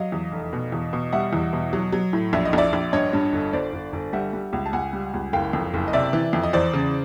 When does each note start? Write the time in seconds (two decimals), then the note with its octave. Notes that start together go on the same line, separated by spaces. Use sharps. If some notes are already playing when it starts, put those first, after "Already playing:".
Already playing: F#3 D#5 F5
0.12 E2
0.32 F1
0.53 B2
0.72 E2
0.93 B2
1.13 G3 E5 F#5
1.33 E2
1.53 B2
1.73 F#3
1.92 F#3
2.13 A2
2.33 A#1 E5
2.45 D#5
2.53 A#1 D5 E5
2.73 A#1
2.93 G2 C#5 D#5
3.13 G2
3.33 G1
3.53 G1 C5 D5
3.73 G1
3.93 G1
4.13 G3 E5 F#5
4.33 G3
4.53 C#2
4.66 A5
4.73 C#2 F#5 G#5
4.93 G3
5.14 C#2
5.33 F#1 F5 G5
5.53 F2
5.74 F#1
5.88 D#5
5.93 C3 D5 E5
6.13 E3
6.33 F2
6.43 D#5
6.53 E2 C5 D5
6.73 C#3